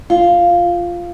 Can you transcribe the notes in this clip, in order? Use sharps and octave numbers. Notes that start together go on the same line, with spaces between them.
F4